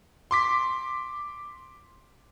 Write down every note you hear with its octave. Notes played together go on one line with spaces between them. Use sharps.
C6 D6 B6